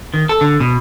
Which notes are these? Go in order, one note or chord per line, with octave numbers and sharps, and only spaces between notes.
D#3
A4
D3
B2